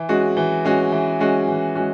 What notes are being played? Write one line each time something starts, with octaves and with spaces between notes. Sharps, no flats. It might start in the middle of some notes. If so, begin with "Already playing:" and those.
Already playing: E3
G#3 C#4 F#4
E3
G#3 C#4 F#4
E3
G#3 C#4 F#4
E3
G#3 C#4 F#4